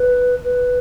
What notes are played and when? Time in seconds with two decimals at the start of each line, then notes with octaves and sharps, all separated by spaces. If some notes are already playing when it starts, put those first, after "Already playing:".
Already playing: B4
0.44 B4